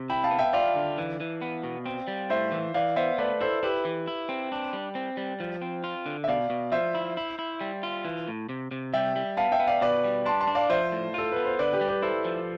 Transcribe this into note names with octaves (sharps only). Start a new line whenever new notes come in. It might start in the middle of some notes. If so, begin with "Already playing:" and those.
Already playing: C3
E4 G5 B5
F5 A5
B3
E5 G5
F4 D5 F5
D3
E3
E3
B3
B2
C4
G3
A2 C5 E5
E3
E3 D5 F5
B3 C5 E5
A3 B4 D5
E4 A4 C5
E4 G4 B4
E3
E4
C4
D4
G3
C4
G3
F3
C4
F4
D3
E5
B2 D5 F5
B2
F3 C5 E5
E4
E4
E4
G3
F4
E3
A2
C3
C3
G3 E5 G5
G3
B3 F5 A5
E5 G5
B3
D5 F5
B2 B4 D5
G3
D4 A5 C6
A5 C6
D4
D5 F5
F3 C5 E5
A2
F4 A4
B3 B4
C5
D3 B4 D5
G4 B4
G3
G4 B4
E4 A4 C5
F3